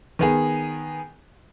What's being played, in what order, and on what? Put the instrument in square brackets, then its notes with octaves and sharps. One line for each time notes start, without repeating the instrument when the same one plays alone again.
[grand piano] D#3 B3 G#4